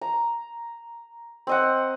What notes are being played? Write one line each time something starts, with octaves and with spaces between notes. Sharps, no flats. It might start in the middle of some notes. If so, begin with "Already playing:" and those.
A#5
C4 D#5 F#5